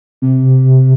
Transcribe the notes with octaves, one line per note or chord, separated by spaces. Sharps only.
C3